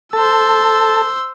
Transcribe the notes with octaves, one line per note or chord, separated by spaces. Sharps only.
A4 C5 A5 E6